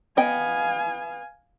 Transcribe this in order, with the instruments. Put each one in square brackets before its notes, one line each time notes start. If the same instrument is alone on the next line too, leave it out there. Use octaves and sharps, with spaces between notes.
[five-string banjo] B3 D#5 G5 [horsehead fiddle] F5 G#5